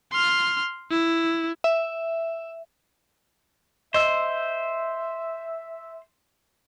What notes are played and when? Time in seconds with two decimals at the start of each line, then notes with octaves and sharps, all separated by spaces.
0.12 C6 F6
0.91 E4
1.64 E5
3.94 C5 D#5 E5 E6